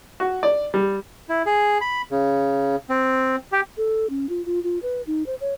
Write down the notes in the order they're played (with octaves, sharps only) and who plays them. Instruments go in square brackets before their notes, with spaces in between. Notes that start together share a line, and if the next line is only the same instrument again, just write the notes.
[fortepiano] F#4
D5
G3
[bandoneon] E4
G#4
B5
C#3
C4
G4
[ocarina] A4
C#4
F4
F4
F4
B4
D#4
C5
C#5